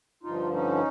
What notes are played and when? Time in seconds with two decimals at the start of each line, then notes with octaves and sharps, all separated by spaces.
0.23 G2 D3 F3 D#4 F4
0.52 C#4 D#4